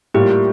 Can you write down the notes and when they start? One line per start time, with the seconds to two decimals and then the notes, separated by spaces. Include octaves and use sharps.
0.14 A2 G3 A#3 F4 G4